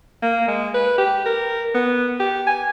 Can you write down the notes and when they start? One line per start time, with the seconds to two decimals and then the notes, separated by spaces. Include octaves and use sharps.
0.22 A#3
0.48 G#3
0.74 B4
0.98 G4
1.26 A#4
1.74 B3
2.20 G4
2.47 G#5